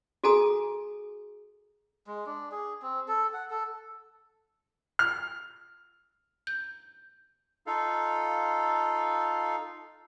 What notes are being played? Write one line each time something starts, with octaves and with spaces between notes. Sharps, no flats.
F#4 G#4 A4 G#5 A#5 D#6
G#3
D4
G#4
C4
A4
F#5
A4
F6
G6
D#4 F4 A4 F5